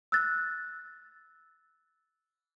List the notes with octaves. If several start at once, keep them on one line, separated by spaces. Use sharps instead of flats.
E6 F#6 A6